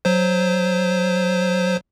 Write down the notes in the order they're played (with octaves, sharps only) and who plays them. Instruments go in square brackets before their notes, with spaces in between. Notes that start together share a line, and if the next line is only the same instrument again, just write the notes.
[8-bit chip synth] F#3 C5